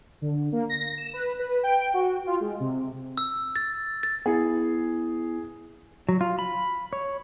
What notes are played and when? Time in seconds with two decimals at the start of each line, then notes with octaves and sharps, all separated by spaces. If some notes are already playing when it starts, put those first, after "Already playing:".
0.22 D3
0.52 A#3
0.70 A#6
0.98 E7
1.13 B4
1.39 B4
1.63 G5
1.94 F#4
2.27 F4
2.40 G#3
2.60 C3
3.18 E6
3.56 A6
4.03 A6
4.26 B3 E4 G#4
6.09 F#3
6.21 F4
6.39 B5
6.93 C#5